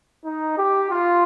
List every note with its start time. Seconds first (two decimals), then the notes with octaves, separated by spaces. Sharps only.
0.23 D#4
0.57 G4
0.90 F4